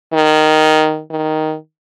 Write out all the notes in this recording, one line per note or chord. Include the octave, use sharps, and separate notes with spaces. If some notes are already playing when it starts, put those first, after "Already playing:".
D#3
D#3